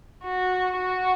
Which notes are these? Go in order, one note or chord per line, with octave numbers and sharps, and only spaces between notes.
F#4
F#4